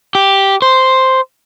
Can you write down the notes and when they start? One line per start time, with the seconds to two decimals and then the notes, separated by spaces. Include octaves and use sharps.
0.15 G4
0.62 C5